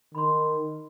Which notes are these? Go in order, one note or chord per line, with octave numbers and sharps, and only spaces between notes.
D#3 B5 C6